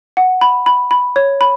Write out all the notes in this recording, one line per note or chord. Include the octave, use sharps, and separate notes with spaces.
F#5
B5
B5
B5
C#5
B5